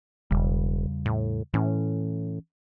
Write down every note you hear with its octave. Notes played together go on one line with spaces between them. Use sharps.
E1 E2 C#3 G3
A2
A2 E3 C#4